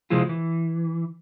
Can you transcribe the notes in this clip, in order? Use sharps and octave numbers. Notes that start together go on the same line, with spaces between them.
C3 F3 G#3 E4 F4
E3